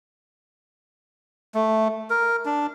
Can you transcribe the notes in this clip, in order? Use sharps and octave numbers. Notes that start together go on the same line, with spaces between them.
A3
A#4
D4